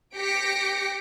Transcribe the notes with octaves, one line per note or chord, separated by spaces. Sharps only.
G4 A#6 B6 C#7 D7